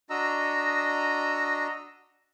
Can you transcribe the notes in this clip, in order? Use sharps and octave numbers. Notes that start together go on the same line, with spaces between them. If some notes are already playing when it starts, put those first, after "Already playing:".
D4 F#4 D#5 A#5 E6